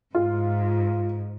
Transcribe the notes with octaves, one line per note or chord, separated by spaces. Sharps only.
G#2 F4